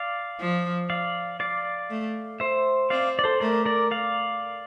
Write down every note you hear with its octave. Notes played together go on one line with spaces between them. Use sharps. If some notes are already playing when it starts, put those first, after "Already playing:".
Already playing: D5 F5
F3
D5 F5
D5 F5
A3
C5 E5
C4 D5 F5
D5
A4 C5
A3 A#4 D5
A#4 D5
D5 F5